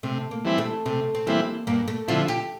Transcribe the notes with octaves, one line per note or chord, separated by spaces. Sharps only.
C3 A3
A#3
E3 G3 C4 E4
A3
C3 A3
C4
E3 G3 A#3 C4 E4
G2 A#3
A3
D3 F3 C4 E4 F4
G4